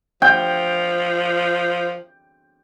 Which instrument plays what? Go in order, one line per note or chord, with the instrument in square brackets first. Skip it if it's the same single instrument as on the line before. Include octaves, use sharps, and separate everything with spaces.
[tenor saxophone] F3 [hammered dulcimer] G5